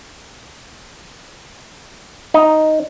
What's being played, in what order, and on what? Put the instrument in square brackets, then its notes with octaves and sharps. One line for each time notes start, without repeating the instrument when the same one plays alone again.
[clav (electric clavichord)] D#4